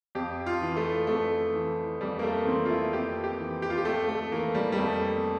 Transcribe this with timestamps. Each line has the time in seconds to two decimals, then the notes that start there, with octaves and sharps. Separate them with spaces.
0.15 F2 G4
0.46 F4
0.61 E3
0.77 A3
1.07 F2 A3
1.54 E3
2.00 F2 G3
2.19 A#3
2.23 A3
2.47 E3 C4
2.65 F4
2.70 E4
2.93 F2 G4
3.24 G4
3.39 E3
3.62 G4
3.70 F4
3.78 G4
3.85 F2 A3
4.09 A3
4.32 E3 A#3
4.55 G3
4.72 G3
4.78 F2 A3